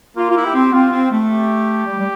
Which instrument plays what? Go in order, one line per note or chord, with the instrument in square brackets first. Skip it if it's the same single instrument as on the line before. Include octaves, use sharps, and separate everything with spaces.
[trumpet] A#3 [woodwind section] F4
[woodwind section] F4
E4
[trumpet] G4
[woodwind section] C4
[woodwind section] C4 [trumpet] F4
[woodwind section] C4
A3
[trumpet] G4
[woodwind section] G3
G3